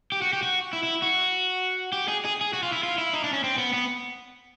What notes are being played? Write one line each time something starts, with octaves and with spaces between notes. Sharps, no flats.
G4
F#4
G4
F#4
E4
E4
F#4
G4
G#4
G#4
G#4
F#4
F4
E4
F4
E4
D#4
D4
C#4
C4
B3
B3